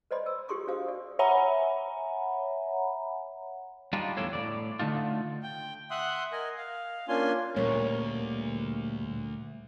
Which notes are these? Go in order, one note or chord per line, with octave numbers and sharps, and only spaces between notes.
B4 C5 D5 D#5 B5 C6
E6
F4 G4 G#4 C6 C#6 D#6
D4 F#4 C5 F5 D#6
D5
C#5 E5 F#5 G#5 A#5 B5
G3 D4 D#4 F4
E2 A2 D4 A4 C#5 F5
A2 G3 D5
D3 A3 D#4 F4
G5
E5 F#5 C6 D#6 F#6
A#4 D#5 G#5
F5
A#3 C#4 D4 F4 G#5 C6
D2 A#2 G3 A#3 A#4 C#5